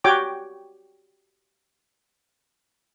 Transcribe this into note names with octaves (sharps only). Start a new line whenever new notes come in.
F#4 G4 C#5 G5 D6